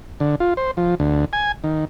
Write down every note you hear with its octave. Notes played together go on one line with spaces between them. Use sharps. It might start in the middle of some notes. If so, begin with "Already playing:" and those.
D3
F4
C5
F3
D2
G#5
D#3